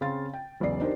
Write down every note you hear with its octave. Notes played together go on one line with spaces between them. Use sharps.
C#3 C4 F5 C6 A6
G5
E1 B1 C#3 D5 C7
D4 D#4 G4 A#4 C5